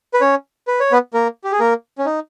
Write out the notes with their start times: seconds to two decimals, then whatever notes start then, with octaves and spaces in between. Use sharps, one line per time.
0.14 B4
0.21 C#4 C#5
0.67 B4
0.80 C#5
0.92 B3 B4
1.14 A#3 A#4
1.44 G4
1.52 G#4
1.60 A#3 A#4
1.98 C#4
2.06 D#4